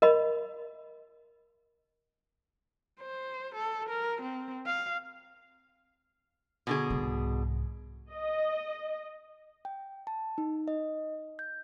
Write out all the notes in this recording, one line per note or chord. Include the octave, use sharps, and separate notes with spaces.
A#4 D#5 B5
C5
A4
A#4
C4
F5
B2 D3 G#4
C2 G#2
D#5
G5
A5
D#4
D#5
G6